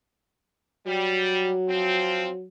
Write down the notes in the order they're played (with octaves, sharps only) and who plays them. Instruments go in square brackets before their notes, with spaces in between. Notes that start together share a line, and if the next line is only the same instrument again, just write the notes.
[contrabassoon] F#3 [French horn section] G3
[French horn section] F3 C4